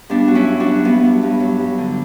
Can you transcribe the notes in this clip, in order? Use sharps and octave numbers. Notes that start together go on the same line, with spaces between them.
G2 B3 D4
F#3 F#4
C#4 E4
G2
D4 F#4
F#3
G2 B3
F#3
G2
F#3
G2
D3